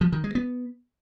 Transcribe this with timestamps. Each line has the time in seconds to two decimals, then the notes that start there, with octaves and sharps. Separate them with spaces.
0.01 F3
0.12 D#3
0.24 G#3
0.35 B3